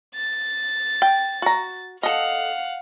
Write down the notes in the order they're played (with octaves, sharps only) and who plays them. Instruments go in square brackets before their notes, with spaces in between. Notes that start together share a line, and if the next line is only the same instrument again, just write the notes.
[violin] A6
[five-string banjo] G5
F#4 A#5
[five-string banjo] A4 D#5 [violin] F5 F#5